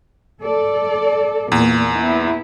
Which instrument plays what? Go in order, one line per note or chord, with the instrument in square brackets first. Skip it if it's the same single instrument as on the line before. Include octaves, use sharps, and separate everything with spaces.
[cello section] A4 D5
[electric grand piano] E2 [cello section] A#2
[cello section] B3 E4